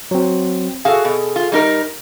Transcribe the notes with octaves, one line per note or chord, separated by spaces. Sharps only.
F#3 C4
F#4 G#4 A4 F5
B2
F4
G3 D#4 A#4